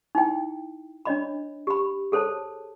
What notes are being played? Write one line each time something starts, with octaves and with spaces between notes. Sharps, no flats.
D#4 E4 G5
D4 C#5 D#5 B5
G4 B5
G#4 A4 C5 C#5 A5